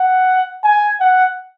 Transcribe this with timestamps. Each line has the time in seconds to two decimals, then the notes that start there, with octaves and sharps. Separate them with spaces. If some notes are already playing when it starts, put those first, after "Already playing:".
Already playing: F#5
0.64 G#5
1.00 F#5